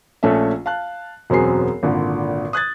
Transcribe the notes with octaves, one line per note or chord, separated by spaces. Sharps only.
A#1 A3 C#4 A4 E5
F5 A5 F#6
E1 F#2 F#3 C4 G#4 C7
G#1 A#2 D3
D#6 F#6 G#6 A6